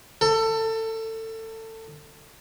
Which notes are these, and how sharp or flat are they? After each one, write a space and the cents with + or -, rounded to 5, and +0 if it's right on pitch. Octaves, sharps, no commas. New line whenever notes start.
A4 +25